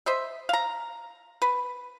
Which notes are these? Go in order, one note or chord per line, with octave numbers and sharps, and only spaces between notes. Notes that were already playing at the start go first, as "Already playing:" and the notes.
C5 D#5 E5
F5 A#5
B4